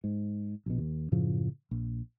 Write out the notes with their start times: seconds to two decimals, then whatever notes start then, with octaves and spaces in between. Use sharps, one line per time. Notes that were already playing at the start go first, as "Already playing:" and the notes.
0.04 G#2
0.66 A#1 B2
0.78 D#2
1.12 F#2 A2 C#3 F3
1.71 A#1